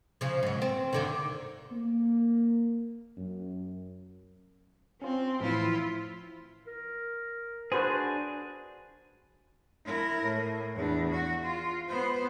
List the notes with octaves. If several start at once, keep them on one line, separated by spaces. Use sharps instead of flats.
C#3 F3
G#2 F#3
C4
G2 D3 D#3
A#3
F#2
C4 C#4 F4
A2 E3 F3 E4 F4
A#4
D4 F#4 G#4 B4 C5
E4 A#4
A2
E2 D4
F#4
F4
B3 C5